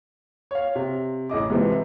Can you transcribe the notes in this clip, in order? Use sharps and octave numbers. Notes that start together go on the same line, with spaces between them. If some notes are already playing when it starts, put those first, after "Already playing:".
C#5 F5
C3
A1 C#3 D#5 D6
G#2 C3 E3 F3